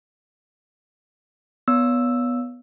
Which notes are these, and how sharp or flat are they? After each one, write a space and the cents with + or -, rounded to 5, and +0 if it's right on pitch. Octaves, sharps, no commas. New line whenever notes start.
B3 +0 C#5 +40 E6 +0